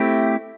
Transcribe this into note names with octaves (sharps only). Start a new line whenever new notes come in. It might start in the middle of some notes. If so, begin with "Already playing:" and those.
Already playing: A3 C4 E4 G4